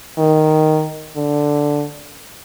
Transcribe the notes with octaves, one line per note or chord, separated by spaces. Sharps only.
D#3
D3